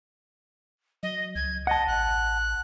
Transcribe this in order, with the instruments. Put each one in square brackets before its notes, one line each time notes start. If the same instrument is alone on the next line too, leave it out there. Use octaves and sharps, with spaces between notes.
[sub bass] F#3 [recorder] D#5
[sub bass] C#2 [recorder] G#6
[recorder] D#5 [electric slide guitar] F#5 A5
[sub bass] A1 [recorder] F#6